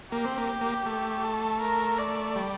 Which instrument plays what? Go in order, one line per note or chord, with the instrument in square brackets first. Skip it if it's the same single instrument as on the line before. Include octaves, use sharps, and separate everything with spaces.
[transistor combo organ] A#3 [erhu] G4
[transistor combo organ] C4
A#3
A#3
A3
[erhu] A4
A#4
D5
[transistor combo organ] G3